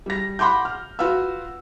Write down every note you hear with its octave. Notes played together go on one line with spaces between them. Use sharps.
G3 A#6
F#5 B5 C6 D6 G6
F6
F4 F#4 B4 F5 E6